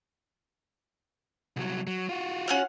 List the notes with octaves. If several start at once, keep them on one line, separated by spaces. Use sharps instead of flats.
C2 F#3
F#3
F4 F#4
C#4 F#5 F6